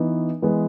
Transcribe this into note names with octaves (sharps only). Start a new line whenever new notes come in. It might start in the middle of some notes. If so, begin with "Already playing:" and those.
Already playing: E3 B3 D#4
E3 G#3 B3